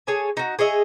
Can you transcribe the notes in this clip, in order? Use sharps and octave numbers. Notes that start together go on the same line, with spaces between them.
G#4 A4 C#5 G#5
D#4 F#4
G#4 C#5 D#5 E5